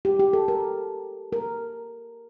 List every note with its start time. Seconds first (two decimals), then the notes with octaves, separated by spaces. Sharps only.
0.05 G4
0.19 G4
0.33 A4
0.48 A#4
1.33 A#4